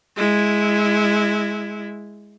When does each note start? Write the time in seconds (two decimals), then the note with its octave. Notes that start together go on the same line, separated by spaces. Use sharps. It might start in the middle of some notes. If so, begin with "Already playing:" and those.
0.16 G#3 E4